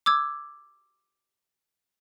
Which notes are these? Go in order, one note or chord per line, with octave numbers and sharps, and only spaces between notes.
D6 E6 G#6